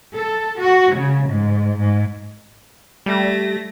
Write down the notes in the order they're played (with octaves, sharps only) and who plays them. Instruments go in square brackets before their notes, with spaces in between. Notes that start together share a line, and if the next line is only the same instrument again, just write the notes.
[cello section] A4
F#4
C#3
G#2
G#2
[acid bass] G3 [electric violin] A3 A#6